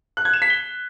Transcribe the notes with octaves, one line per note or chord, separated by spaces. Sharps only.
F#6
G#6
E7
B6
G7